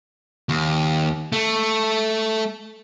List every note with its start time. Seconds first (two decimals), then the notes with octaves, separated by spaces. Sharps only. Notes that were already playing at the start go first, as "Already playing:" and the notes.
0.49 D#2
1.32 A3